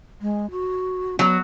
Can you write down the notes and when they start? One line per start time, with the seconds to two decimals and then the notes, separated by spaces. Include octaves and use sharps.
0.21 G#3
0.51 F#4
1.19 F#3 B3